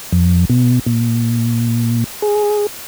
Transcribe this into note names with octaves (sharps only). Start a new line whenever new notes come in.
F2
B2
A#2
G#4